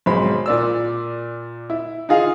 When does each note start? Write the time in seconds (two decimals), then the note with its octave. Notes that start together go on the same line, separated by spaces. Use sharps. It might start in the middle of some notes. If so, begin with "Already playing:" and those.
0.06 B1 G#2 G#3 C4 B5
0.46 A#2 D5 E6
1.70 E4
2.09 D#4 F4 G#4 F5